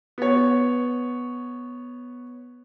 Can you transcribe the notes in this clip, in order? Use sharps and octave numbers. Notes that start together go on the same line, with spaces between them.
B3 C#5